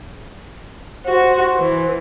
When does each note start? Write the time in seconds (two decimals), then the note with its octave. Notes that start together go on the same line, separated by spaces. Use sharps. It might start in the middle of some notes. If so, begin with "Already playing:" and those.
1.06 F#4 C5
1.56 E3